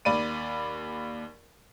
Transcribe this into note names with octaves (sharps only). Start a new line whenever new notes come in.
D#2 D5 B5 D#7